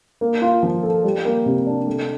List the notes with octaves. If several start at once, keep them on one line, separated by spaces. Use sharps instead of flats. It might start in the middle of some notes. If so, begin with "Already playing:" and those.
A#3
F4
F3
A4
G3
A#3
C3
D4
A3